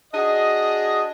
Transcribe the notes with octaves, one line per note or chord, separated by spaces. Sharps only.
D4 F#4 G#4 D#5